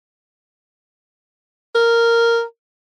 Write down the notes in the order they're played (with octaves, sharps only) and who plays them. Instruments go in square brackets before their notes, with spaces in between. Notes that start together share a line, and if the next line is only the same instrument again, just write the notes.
[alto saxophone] A#4